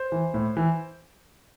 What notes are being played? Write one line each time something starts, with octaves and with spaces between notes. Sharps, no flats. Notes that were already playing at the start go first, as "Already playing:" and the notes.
Already playing: C5
E3
A2
E3